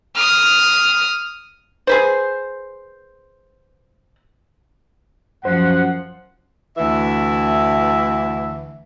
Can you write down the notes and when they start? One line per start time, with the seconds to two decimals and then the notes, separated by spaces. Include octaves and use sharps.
0.15 D#6 F6
1.87 G#4 B4 C5
5.45 F#2 F3 C5 F#5
6.77 D2 E3 E4 E5